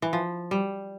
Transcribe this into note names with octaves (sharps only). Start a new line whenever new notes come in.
E3
F3
G3